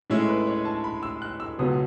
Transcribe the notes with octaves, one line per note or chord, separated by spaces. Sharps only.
A2 G#3 C#4 E4 C#5
B4
C#5
A5
B5
E6
F#6
E6
C#2 B2 F#3 B3 D#6